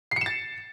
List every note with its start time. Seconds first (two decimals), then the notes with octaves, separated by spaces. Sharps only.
0.11 C7
0.16 C#7
0.21 E7
0.26 A6